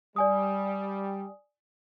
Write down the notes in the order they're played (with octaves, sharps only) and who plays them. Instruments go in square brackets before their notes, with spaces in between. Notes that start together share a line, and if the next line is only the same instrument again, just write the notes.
[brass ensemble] G3 [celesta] D5 G#5 D#6